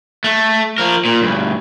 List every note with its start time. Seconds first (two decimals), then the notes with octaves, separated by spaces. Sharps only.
0.24 A3
0.78 F3 A#4
1.05 A#2
1.22 D2 G2